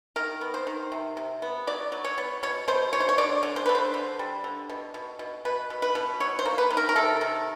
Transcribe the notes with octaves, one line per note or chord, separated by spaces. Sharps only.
D#3 A#4
B3
C5
D#3
C3
C3
B3
F#3 D5
F#3
C#5
B3
B2 C#5
B2 C5
B2 C#5
C5
C#5
D3 D5
D3
C5
D3 B4
C5
D3
G3
D3
B2
B2
B2
B2 B4
B2
B4
B2
F#3 C#5
C5
A#3
B4
D#3
A#4
A#4
C3 A4
D#3